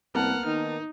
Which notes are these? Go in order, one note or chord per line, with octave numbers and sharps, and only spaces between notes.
C2 A#3 B3 F#5 A5 F6
D#3 D#4